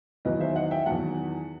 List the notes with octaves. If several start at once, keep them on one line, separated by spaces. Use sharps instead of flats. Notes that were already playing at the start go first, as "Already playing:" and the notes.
E2 D#3 F#3 B4 D#5
C5 E5
D#5 F#5
E5 G5
E2 D#3 F#3 F#5 A5